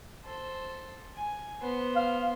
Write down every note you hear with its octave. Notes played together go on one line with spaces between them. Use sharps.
A4 C5
G#5
B3 C5
F5